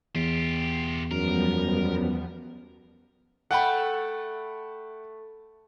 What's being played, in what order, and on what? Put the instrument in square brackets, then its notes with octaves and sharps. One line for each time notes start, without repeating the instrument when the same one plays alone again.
[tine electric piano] E2 [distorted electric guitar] F4 G4
[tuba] F#2 [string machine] F3 G3 B3 [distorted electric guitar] A#4
[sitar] A3 [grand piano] F#5 G5 B5